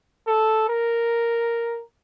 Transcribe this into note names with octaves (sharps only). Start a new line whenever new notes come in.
A4
A#4